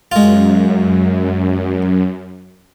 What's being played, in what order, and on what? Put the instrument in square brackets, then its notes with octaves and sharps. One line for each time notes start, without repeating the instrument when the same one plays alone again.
[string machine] F#2 [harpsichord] G#3 F4